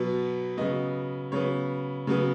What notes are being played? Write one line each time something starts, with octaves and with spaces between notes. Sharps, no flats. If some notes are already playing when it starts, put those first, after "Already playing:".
Already playing: B2 F#3 B3
C#3 F#3 B3 D#5
C#3 F#3 B3 C#5
C#3 F#3 B3